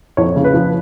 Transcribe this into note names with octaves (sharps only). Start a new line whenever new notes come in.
F2 C#5
C#3
B4
F3